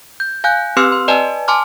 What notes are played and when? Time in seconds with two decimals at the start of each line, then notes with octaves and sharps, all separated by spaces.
0.20 G6
0.44 F5 G#5 F#6 G6
0.77 C4 G4 B4 C6 E6 F6
0.92 C6
1.08 B4 D5 D#5 G#5 A5
1.48 G#5 A5 C6 D6 F6